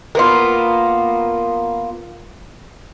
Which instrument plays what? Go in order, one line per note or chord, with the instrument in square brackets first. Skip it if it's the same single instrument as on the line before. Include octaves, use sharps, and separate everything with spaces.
[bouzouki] A#3 B3 F4